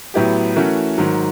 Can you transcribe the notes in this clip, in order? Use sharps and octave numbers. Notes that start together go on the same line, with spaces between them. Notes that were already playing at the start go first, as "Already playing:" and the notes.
A2 F#3 B3 E4 G4
E3 A3 C#4 F#4 A#4
G#2 D#3 F#3